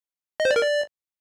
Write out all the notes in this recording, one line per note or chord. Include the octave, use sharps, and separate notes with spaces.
D#5
C5
D5
A#4
D5